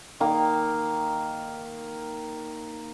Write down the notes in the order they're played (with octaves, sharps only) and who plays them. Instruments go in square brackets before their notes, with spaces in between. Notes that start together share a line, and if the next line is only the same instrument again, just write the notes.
[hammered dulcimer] D#3 A#3 A#5